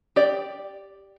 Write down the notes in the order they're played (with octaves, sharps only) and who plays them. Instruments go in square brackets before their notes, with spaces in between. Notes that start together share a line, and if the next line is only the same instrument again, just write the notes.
[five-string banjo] G4 D5